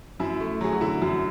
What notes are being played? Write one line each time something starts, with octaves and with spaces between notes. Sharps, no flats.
F#2 E4
A3
F#3 G#4
F#4
D3 E4
F#2